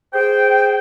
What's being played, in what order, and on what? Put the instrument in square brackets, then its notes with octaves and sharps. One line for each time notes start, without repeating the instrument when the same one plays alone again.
[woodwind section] G#4 C5 G5